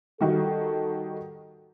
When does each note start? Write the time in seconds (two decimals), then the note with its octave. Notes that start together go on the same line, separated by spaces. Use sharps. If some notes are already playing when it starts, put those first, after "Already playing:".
0.21 D#3 G3 F#4 A4